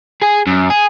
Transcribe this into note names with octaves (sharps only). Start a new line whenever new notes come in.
G#4 G#5
F#2
G#4